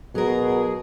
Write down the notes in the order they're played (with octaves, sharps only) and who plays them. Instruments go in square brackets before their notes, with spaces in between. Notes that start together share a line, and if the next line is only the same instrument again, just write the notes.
[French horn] B2 [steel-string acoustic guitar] F#3 A#4 [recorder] G#4